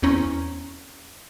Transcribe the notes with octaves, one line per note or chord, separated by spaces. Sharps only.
E2 C4 C#4 A#5